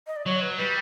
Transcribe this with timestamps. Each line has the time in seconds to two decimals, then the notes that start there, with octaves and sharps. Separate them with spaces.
0.07 D#5
0.16 D5
0.26 F#3 C#5
0.42 B4
0.58 G3 B4